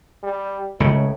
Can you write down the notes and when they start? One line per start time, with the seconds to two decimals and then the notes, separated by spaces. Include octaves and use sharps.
0.23 G3
0.80 C#2 A2 C#3